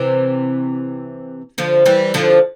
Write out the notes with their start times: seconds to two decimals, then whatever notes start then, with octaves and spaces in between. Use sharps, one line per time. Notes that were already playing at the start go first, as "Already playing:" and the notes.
Already playing: C3 E3
1.58 D3 F3
1.86 E3 G3
2.14 D3 F3